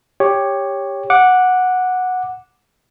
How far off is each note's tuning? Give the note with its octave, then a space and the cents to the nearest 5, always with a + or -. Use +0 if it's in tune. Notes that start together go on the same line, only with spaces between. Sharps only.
G4 +10 C#5 +0
F#5 -10 D6 +0